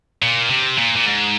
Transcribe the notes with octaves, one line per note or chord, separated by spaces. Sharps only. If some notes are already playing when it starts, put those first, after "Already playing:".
A#2
C3
A#2
A#2
G#2